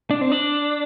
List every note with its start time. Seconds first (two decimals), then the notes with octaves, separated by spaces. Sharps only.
0.11 D4
0.21 C4
0.32 D4